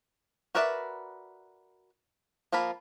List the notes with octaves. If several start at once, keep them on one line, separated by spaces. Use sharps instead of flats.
F#4 A#4 B4 D5 E5
F3 A#3 F4 B5